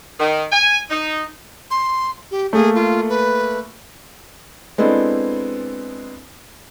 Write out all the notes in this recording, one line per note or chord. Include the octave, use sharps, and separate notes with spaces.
D#3
G#5
D#4
C6
G4
A3 A#3 G#4
F4
B4
G#3 B3 C4 D4 E4 A4